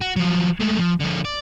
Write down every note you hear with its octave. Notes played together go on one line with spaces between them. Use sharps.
F#4
F3 F#3
G#3 A3
F3
D3 F3
D5